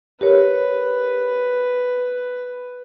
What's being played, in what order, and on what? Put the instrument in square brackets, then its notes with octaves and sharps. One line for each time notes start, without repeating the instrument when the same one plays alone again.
[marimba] G4 A#4 C#5 [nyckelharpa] B4